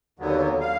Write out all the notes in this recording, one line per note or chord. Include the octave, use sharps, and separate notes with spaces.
D#2 D3 F#3 B3
F5